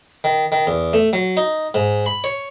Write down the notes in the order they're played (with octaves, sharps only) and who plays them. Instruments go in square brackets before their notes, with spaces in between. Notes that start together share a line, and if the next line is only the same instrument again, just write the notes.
[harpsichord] D#3
D#3
E2
A3
F#3
D#4
G#2
B5
C#5